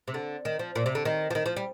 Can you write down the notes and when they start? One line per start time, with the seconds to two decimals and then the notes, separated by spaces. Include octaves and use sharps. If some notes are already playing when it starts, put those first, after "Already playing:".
0.08 C3
0.14 D3
0.45 D#3
0.59 F3
0.75 A#2
0.86 C3
0.95 D3
1.05 D#3
1.30 F3
1.35 D#3
1.46 F3
1.56 G3